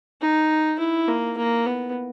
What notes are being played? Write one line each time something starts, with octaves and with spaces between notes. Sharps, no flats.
D#4
E4
A#3
A#3
B3